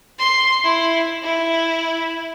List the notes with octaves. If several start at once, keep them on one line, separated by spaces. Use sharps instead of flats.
C6
E4
E4